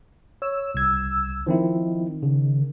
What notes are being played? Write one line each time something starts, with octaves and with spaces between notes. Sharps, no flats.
C#5 E6
C2 G#6
D#3 F3 C4 E4
C#3